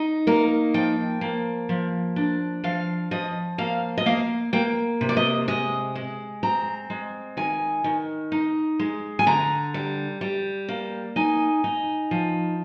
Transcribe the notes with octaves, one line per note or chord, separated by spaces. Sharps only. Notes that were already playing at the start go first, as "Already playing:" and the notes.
Already playing: D#4
A#3 A#4
F3 G5
A#3
F3
D4
F3 F5
F3 D#5
A#3 F5
D#5
A#3 F5
A#3 G5
C3
D5
D#5
G#3 D#5
G#3
C4 A#5
G#3
D#3 G#5
D#3
D#4
G#3
G#5
D3 A#5
G3
G3
A#3
D#4 G#5
D#4
F3